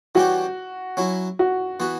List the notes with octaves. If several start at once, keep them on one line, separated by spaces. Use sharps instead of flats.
E3 G3 C#4 F#4 G4
F#3 C#4 E4
F#4
E3 B3 F#4